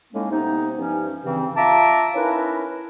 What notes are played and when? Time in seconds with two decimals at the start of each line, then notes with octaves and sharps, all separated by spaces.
0.13 A2 G#3 A#3 C#4 D#4
0.30 C3 B3 D#4
0.78 G2 F3 C#4
1.24 G2 C#3 E3 C4
1.56 F4 E5 A5 A#5 D6
2.14 C#4 D#4 E4 A#4 B4